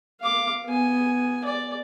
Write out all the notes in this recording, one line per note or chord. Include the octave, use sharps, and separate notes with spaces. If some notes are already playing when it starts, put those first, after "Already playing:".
F5 D6
B3 G#5
D5